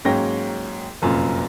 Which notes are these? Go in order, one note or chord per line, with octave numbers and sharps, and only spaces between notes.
G#2 F#3 A#3 C#4 G5 A#6
F1 F#2 A#2 C4